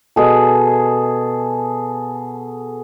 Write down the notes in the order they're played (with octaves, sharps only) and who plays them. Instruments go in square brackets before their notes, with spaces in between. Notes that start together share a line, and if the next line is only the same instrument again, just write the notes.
[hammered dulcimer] B2 G#4 A4